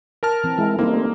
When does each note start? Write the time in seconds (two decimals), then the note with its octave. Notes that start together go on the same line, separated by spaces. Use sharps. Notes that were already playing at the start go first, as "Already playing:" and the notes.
0.23 A#4 A5 F6
0.44 E3 C4
0.58 E3 G#3 E4
0.79 G3 A#3 C4 D#4 E4 A4
0.94 A3 C4